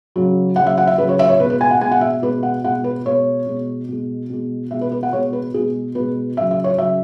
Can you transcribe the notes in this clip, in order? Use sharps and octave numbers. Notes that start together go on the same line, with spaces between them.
C#3 F#3
C#3 F#5
F#3
E5
F#5
E5
C#3 F#3 B4
C#5
E5
C#5
B2 B4
G#3
B4
G#5
F#5
B2 G#3 G#5
F#5
E5
B2 G#3 B4
F#5
B2 G#3 F#5
B4
B2 G#3 C#5
B2 G#3
B2 G#3
B2 G#3
B2 G#3 E5
B4
B4
F#5
B2 G#3 C#5
B4
B2 G#3 G#4
B2 G#3 B4
C#3 F#3 E5
E5
C#5
C#3 F#3 E5